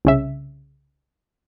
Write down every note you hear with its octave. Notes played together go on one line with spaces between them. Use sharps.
C2 C#3 E5